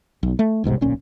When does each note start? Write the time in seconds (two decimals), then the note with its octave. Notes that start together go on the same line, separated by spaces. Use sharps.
0.23 B1
0.39 A3
0.64 D#1 B1 G#2 C3
0.81 D1 B1 A#2 C#4